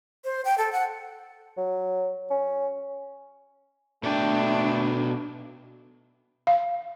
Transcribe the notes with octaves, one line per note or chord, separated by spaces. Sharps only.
C5
G5
A4
F#5
F#3
C#4
B2 A3 D4 A4 G5
F5